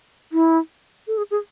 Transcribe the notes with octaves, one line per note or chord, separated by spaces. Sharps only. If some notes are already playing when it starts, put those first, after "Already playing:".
E4
A4
G#4
G#4